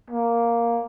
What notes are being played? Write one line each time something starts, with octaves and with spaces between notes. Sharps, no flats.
A#3